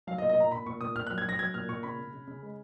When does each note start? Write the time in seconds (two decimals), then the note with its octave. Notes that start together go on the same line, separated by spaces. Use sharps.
0.07 F#3 F5
0.18 D#5
0.22 A#2
0.29 D#5
0.37 A#2 A#5
0.52 A#2 B5
0.66 A#2 C#6
0.81 A#2 D#6
0.96 A#2 F6
1.07 F#6
1.10 F#3
1.18 G#6
1.25 F#3 A#6
1.39 F#3 G#6
1.54 A#2 F6
1.68 A#2 C#6
1.83 C#3 B5
1.99 C#3
2.13 C#3
2.27 C#3
2.42 G#3